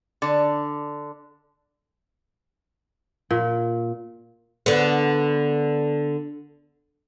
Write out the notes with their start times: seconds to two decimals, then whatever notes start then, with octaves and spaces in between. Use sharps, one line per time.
0.22 D3
3.31 A#2
4.66 D3 B3